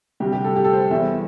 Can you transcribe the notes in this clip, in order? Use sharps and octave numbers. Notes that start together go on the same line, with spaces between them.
D2 C3 G3 G4
G4
A4
G4
A4
C5
E2 E3 G3 E5